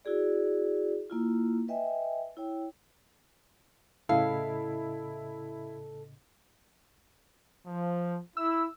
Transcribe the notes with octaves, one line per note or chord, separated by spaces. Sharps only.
E4 F#4 G#4 D5
A#3 E4 F4
B4 D#5 E5 G5 G#5
E4 C#5 G5
A2 C#3 E4 A4 D#5 F5
F3
E4 E6